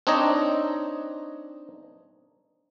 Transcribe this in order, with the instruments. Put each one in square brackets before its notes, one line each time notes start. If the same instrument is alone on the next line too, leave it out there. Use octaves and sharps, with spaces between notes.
[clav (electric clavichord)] C4 D4 D#4 C#5 D#5